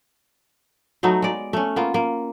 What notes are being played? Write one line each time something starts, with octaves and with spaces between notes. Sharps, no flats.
F#3 A3 B3 D#4
G#3 D5
A3 C#4
A#3 B3 F4
A#3